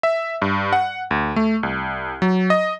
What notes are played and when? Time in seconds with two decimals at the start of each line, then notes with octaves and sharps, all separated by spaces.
0.03 E5
0.42 G2
0.73 F#5
1.11 D2
1.36 A3
1.63 C2
2.22 F#3
2.50 D#5